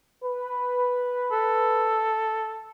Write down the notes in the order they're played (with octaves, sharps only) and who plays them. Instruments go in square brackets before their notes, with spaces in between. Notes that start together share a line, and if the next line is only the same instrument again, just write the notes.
[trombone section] B4
[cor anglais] A4